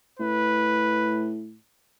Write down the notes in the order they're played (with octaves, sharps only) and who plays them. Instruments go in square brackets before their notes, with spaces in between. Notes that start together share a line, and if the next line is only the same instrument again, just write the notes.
[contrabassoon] A2 [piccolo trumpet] B4